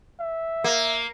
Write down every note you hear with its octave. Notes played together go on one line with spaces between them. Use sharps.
E5
A#3